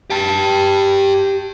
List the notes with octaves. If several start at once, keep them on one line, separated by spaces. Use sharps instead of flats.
G4 A5